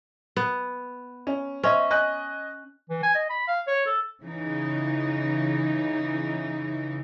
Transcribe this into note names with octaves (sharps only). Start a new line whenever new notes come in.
B3
C#4
C#4 C5 D#5 E5
D#5 G#5 F#6
E3
G#5
D#5
B5
F5
C#5
A4
C#3 E3 D#4